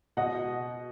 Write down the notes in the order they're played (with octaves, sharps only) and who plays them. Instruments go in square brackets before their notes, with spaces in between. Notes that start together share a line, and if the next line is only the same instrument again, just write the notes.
[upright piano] B2 D#5 F#5